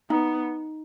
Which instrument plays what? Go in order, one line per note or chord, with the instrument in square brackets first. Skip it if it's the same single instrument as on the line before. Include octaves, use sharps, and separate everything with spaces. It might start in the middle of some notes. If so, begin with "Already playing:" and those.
[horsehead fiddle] B3 [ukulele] D#4